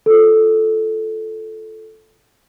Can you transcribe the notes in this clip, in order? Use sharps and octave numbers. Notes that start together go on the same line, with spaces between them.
F4 A4